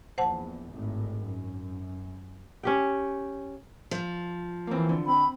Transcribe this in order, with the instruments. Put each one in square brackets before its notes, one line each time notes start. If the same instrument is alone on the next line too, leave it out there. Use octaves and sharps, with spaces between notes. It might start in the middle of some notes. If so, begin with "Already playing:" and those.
[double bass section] A#1 E2 [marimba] C5 F#5 A5
[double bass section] G#1 A2
F#2
[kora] C#4 G4 G5
[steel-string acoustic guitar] F3
[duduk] E3 [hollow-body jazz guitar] A#3 C4
[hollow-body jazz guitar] D3
[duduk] C4 [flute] B5